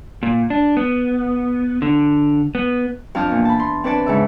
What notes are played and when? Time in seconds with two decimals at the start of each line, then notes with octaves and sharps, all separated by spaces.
0.23 A#2
0.50 D4
0.77 B3
1.82 D3
2.55 B3
3.15 F2 D4 F5 A5 D#6 G6
3.29 E2 A#2
3.45 A5 B5
3.60 C6
3.84 C4 D4 B4 C#5 D5 A5
4.06 G#2 C#3 E5